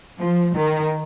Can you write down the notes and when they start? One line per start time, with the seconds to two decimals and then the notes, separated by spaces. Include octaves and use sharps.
0.19 F3
0.55 D#3